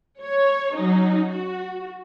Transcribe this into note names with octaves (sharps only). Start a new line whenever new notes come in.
C#5
F#3 C#4 D#4
F#4